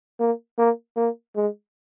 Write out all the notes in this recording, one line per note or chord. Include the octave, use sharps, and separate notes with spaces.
A#3
A#3
A#3
G#3